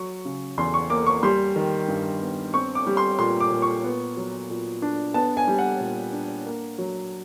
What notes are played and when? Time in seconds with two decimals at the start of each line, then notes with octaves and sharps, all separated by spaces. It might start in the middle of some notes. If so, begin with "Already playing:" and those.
Already playing: F#3 C#6
0.25 C#3
0.58 E2 C6
0.74 C#6
0.90 A#3 D6
1.07 C#6
1.23 G3 C6
1.56 D#3
1.88 G2
2.21 B3
2.54 C4 C#6
2.75 D6
2.87 G3
2.97 C6
3.19 A#2 C6
3.40 D6
3.52 A#2
3.62 C#6
3.84 B3
4.17 F#3
4.50 A#2
4.82 D4
5.14 B3 A5
5.37 G#5
5.48 G3
5.59 F#5
5.80 A#2
6.13 D4
6.45 A#3
6.78 F#3